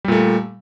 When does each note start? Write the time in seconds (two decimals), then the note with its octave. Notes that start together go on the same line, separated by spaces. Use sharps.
0.05 G3
0.08 A#2
0.12 A3